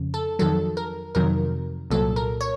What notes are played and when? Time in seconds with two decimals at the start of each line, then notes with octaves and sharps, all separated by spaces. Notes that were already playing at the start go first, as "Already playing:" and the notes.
Already playing: F2 C#3
0.14 A4
0.39 F2 D#3 F#3 A4
0.77 A#4
1.15 F2 C3 D#3 F#3 A#4
1.90 C2 A#2 F#3 A4
2.16 A#4
2.41 C#5